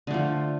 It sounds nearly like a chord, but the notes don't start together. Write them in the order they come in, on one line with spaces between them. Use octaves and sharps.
D3 A3 F3